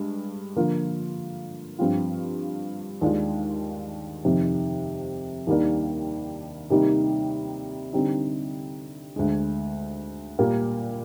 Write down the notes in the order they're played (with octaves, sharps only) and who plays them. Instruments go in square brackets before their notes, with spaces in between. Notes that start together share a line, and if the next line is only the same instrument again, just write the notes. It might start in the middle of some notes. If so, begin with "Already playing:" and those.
Already playing: [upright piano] G2 G#3
D3 F3 A#3 F4
G2 F3 C4 F4
D#2 D#3 G#3 D4 F4
F2 C3 D#3
D#2 D#3 G3 A#3 D4
C3 D#3 G3 A#3 D#4
D3 G3 C4 D#4
D2 D3 G#3
A#2 G3 A#3